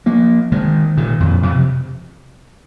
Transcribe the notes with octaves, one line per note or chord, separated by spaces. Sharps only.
F3 A#3
D#3 G#3
A#2 D#3
F2 A#2
F2 A#2
C3